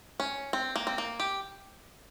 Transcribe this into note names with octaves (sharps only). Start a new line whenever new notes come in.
C#4
C4
A#3
C4
A#3
G4